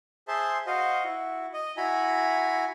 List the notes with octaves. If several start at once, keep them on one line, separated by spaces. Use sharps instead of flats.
G#4 C5 E5 A5 C6
F#4 C5 D#5 F5
E4 F#4
D#5
E4 F#4 G#5 A#5 B5